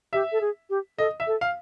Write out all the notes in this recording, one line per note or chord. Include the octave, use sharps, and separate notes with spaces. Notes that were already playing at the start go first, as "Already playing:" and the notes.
G4 E5
A4
G#4
G4
A4 D#5
E5
A4
F5